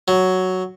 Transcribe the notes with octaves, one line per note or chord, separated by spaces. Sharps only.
F#3